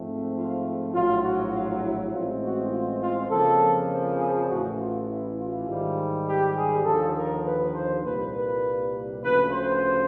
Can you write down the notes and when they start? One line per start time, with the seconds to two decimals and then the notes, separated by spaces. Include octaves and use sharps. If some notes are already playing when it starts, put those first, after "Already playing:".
Already playing: G#2 F3 A3 C4
0.34 F4
0.93 A#1 A2 F#3 F4
1.23 F#4
1.52 F4
1.83 E4
2.12 A1 A2 E3 G#3 C4 F4
2.41 F#4
2.70 F4
3.01 F4
3.30 F2 C#3 F3 A#3 A4
4.19 G#4
4.48 A1 A2 E3 F#4
4.78 F4
5.08 E4
5.38 F4
5.67 G#2 D#3 G3
6.26 G4
6.56 G#4
6.84 D#2 D3 F3 A4
7.15 A#4
7.44 B4
7.74 C5
8.03 C2 A#2 G3 A#3 B4
8.33 B4
9.21 D2 C#3 F3 B4
9.51 C5